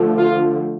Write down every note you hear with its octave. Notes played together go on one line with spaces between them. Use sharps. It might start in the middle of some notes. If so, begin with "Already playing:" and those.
Already playing: D3 F3 A3
F4